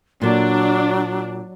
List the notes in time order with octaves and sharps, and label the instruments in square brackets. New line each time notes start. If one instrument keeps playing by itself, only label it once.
[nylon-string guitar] A#2 A4 [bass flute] F#3 [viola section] D4